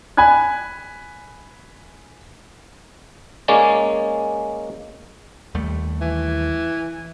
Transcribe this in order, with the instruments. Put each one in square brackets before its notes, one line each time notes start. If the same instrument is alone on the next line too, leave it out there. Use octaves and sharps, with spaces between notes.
[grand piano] G#5 B5 F#6 G#6
[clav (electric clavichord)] G#3 A#3 C#4 D5
[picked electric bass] D#2 G3 A3
[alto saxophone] E3